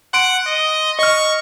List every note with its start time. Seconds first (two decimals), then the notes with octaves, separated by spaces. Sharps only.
0.14 F#5 C6 D7
0.47 D#5
0.99 D#5 C#6 F6